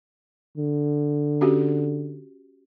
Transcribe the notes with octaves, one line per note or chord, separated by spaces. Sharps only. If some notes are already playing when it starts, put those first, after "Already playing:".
D3
C#4 F#4 G4